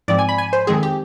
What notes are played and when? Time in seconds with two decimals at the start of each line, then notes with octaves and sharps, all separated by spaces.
0.08 G#2 F3 C4 D5
0.19 G#5
0.29 B5
0.38 G#5
0.53 C5
0.67 F2 D#3 G#3 C4 G#4
0.83 G4